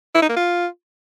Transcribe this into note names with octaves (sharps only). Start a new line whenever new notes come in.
E4
D#4
A#3
F4